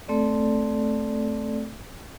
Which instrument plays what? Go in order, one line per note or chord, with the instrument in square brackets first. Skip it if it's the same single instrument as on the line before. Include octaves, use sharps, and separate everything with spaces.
[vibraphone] A3 C4 A4 D5